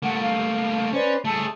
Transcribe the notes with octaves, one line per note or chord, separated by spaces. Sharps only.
A3 A#3 F#5
F5
C#4 B4 C5 D5
A3 G#4 A5 E6